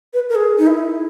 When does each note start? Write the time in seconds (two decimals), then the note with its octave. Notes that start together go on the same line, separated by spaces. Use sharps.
0.13 B4
0.30 A#4
0.35 G#4
0.58 D#4
0.67 E4